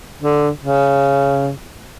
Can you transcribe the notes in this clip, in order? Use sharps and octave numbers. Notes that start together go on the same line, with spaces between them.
D3
C#3